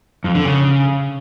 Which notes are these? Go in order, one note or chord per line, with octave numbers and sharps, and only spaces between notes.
F2
D3
C#3